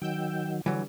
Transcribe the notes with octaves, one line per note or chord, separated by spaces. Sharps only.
D#3 F#3 G5 E6 G6
D3 E3 F#3 G3